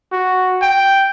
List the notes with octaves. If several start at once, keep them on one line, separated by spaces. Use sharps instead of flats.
F#4
G5